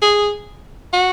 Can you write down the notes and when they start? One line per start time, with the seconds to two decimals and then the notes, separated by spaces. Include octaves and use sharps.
0.02 G#4
0.93 F#4